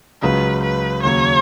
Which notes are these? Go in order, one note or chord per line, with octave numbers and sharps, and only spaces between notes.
C#2 C#3 F#3 B4
B4
D#2 C#3 F#3 C#5